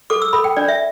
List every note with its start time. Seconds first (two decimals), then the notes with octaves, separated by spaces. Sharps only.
0.10 A4 D6
0.22 E6
0.33 A4 B5
0.44 G5
0.57 D4 D5
0.68 E5